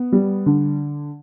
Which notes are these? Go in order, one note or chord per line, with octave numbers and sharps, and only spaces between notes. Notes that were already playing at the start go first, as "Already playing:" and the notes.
Already playing: B3
G3
D3